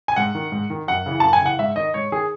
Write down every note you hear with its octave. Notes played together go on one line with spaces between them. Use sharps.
G#5
G#2 F#5
D#3
G#2
D#3
F#2 F#5
C#3 E3
F#2 A5
G#5
C#3 E3 F#5
G#2 E5
D#3 D#5
G#2 C#5
D#3 G#4